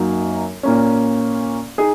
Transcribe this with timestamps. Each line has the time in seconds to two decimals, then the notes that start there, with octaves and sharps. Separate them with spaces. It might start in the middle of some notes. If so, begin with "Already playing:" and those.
Already playing: F#2 F#3 A#3 D#4
0.63 A#2 A#3 C#4
1.78 D#4 G#4